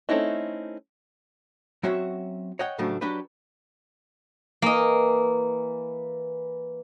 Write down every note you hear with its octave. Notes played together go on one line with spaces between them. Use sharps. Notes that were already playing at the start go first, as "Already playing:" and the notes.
A3 C4 C#4 D#4 E4
F#3 C4 C#4 F#4 C#5 E5
C#5 D#5 F#5 G5
A2 C#3 F3 F#3 A3 D4
F#3 D4 G4 B4
E3 A#3 D#5